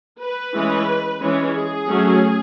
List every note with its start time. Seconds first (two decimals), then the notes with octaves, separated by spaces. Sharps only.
0.21 B4
0.55 E3 G#3 C#4
1.22 E3 G#3 C#4
1.55 G#4
1.88 F#3 A3 C#4